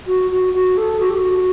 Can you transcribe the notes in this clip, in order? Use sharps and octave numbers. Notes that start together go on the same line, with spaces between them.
F#4
F#4
F#4
A4
F#4
G4
F#4